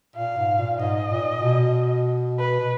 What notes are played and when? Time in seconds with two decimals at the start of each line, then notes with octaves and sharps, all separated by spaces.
0.16 A#2 F5
0.37 G#2
0.58 A#2
0.79 G#2 D#5
1.12 A#2
1.43 B2
2.39 B4
2.60 B2